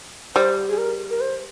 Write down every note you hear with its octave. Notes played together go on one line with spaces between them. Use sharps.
G3 C5
G#4
A#4
A#4
C5